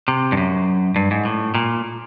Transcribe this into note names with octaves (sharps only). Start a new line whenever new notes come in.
C3
G2
F#2
G2
G#2
A2
A#2